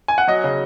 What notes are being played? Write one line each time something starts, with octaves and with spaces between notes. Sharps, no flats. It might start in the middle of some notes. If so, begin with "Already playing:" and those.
G#5
F#5
F#3 D#5
C#3